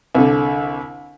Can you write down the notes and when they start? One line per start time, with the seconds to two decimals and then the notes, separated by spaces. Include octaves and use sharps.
0.14 C2 D3